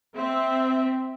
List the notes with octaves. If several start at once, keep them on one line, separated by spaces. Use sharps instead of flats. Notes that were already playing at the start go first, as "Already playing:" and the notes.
C4 E5